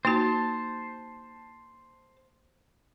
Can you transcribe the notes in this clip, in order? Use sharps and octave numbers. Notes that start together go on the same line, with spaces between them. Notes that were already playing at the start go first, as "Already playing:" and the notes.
A#3 D#4 F#4 C5 A5